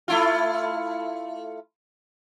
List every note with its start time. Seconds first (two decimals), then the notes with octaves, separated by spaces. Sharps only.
0.08 A3 E4 F4